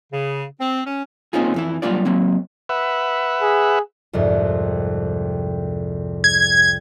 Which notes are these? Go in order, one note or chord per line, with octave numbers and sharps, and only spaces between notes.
C#3
C4
C#4
A#3 C4 C#4 D#4 F4 G#4
F2 E3 E4
F#3 G3 A#3 D4 F4 D5
F#3 A#3 C4
B4 E5 F#5
G#4
C2 F2 G#2
G#6